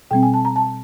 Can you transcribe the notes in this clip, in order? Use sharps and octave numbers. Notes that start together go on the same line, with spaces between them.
B2 G3 C4 G5
G#5
A5
A#5
A5